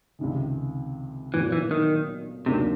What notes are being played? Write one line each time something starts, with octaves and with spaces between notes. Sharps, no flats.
C#2 C3 D#3
B1 A#2 E3 F#3 A#3
E3
D#3
D#2 C3 D#3 F#3 A#3 D4